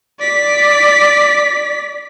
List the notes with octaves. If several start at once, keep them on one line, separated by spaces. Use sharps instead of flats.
D5 B6